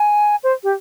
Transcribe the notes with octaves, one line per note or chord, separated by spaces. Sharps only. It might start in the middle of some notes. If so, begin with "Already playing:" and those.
Already playing: G#5
C5
G4